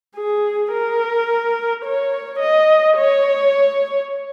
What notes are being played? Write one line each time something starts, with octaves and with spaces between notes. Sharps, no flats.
G#4
A#4
C#5
D#5
C#5